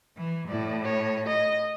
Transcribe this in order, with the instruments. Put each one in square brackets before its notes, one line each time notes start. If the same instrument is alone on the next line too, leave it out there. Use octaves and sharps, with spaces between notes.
[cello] E3
[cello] A2 [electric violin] E4 D5
[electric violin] C#5
D#5